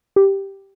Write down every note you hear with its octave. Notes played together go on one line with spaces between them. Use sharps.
G4